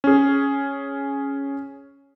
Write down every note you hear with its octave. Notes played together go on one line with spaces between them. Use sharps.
C#4 G#4